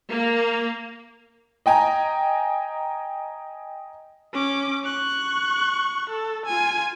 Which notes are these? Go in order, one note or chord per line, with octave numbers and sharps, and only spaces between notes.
A#3
D#5 G5 G#5 A#5
C#4 D6
C#6 F#6
A4
F4 G#5